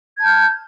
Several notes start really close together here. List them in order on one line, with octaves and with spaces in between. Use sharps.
G#6 A5 G6 F6